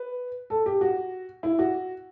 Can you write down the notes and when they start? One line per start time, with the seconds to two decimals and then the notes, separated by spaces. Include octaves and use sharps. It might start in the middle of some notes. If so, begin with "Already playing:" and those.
Already playing: B4
0.50 A4
0.66 G4
0.81 F#4
1.43 E4
1.59 F#4